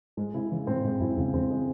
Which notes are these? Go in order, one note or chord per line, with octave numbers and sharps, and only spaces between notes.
G#2 G#3
C3 E4
C#3 E3
A2 C4
A2 G#3
F#2 E4
E2 C#3
E2 C4
G#3